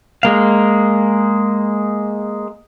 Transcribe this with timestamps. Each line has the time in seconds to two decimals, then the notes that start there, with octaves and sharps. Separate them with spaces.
0.23 G#3 A#3 F5